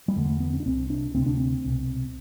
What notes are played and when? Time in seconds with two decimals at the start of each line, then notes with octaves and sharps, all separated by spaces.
0.08 G3
0.16 E2 D3 A3
0.29 A3
0.40 B3
0.53 C4
0.60 D4
0.66 C2 C3 C4
0.90 D4
1.14 D2 C3 C4
1.26 D4
1.37 C4
1.64 C2 B2